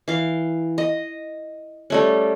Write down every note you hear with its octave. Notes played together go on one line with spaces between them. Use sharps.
E3 F5
D#5
G3 A3 C#4